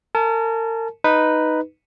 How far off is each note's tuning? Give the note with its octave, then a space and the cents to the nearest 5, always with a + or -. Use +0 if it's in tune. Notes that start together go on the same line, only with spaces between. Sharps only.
A#4 -40 A5 -35
D#4 +0 B4 +0